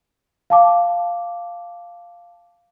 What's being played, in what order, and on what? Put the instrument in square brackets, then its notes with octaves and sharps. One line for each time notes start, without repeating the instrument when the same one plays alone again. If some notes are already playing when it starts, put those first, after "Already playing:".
[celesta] F5 A5 D6